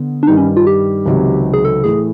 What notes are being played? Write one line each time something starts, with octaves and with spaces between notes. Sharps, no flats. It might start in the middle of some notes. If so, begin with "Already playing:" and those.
Already playing: D3 B3
D4
G2 D#3 G3 D#4
C#4
F4
G4
C#2 C3 D#3 F#3
G#4
A4
A2 E3 A3 G#4